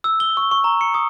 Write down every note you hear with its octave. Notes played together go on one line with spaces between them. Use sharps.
E6
G7
C#6
C#6
A#5
C#7
D#6